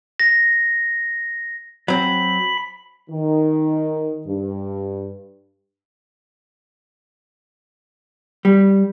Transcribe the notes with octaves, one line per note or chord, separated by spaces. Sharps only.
A#6
F#3 C4 B5
D#3
G2
G3